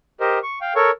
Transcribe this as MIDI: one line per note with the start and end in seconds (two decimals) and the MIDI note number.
0.20 0.39 67
0.20 0.39 70
0.20 0.39 72
0.20 0.39 75
0.43 0.59 85
0.61 0.74 77
0.61 0.74 79
0.76 0.91 69
0.76 0.91 70
0.76 0.91 73
0.76 0.91 85